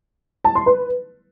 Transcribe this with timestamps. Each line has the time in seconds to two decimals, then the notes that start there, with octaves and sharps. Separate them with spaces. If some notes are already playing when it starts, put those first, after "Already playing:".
0.44 A5
0.55 C6
0.66 B4